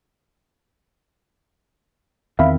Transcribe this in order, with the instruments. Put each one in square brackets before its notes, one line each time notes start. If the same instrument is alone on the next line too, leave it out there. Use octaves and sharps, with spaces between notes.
[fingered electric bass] E2 D#3 C4 [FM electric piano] E5 F5 B5